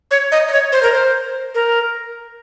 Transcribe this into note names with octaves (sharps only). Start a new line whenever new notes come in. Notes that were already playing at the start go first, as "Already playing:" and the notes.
C#5
D#5
D#5
C#5
C5
A#4
C5
A#4